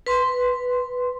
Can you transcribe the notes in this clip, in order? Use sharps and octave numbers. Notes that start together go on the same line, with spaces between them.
B4 C6